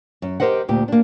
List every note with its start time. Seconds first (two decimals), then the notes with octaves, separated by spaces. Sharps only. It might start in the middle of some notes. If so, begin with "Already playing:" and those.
0.22 F#2
0.40 G4 A#4 C5 D#5 F#5
0.68 D2 A#2 G4
0.88 A#3 D4